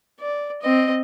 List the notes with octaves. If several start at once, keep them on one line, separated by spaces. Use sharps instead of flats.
D5
C4 D#5